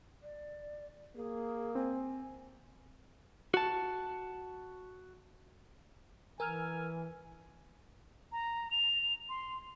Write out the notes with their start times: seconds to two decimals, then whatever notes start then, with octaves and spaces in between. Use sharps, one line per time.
0.23 D5
1.15 A#3 G#4
1.75 C4 G#5
3.54 F#4 A5
6.40 E3 A#4 G#5 E6 F6
8.32 A#5
8.71 F7
9.29 C6